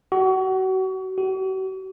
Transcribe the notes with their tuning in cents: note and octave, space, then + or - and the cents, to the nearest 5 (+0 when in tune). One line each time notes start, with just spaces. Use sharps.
F#4 +30
F#4 +40